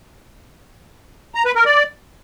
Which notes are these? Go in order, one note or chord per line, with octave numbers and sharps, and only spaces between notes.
A#5
B4
A#4
D5